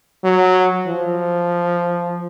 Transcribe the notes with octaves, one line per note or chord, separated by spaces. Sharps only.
F#3
F3